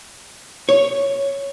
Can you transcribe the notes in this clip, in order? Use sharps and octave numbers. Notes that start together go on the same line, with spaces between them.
C#5